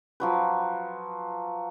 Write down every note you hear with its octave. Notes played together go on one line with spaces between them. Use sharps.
F3 F#3 B4